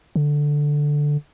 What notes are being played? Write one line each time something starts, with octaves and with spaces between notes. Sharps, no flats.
D3